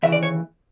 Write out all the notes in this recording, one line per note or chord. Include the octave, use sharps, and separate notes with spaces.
D#2 C#3 E3 E5
D5
C#5